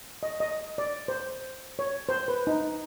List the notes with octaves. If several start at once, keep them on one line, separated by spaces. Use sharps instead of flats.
D#5
D#5
D5
C5
C#5
C5
B4
D#4